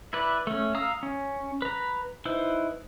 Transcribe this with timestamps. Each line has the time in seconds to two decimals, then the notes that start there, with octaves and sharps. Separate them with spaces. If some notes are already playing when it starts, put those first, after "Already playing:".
0.13 E4 B4 D5
0.47 A3 C#4
0.75 F5 A#5 D#6 E6
1.03 C#4
1.62 B4 A#5
2.25 D#4 E4 B4 C5